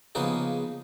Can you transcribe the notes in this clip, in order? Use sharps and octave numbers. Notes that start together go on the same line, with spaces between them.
C#3 F3 A#3 B3 D#4 G#4